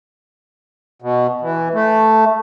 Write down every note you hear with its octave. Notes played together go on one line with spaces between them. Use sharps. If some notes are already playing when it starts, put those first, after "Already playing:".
B2
E3
A3